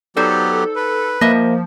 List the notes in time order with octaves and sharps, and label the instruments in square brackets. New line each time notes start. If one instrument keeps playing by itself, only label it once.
[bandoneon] F#3 B3 G4 [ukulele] D#4 C5 D5 [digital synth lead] A4
[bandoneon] B4
[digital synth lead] F3 [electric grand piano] A#3 [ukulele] D#5 E5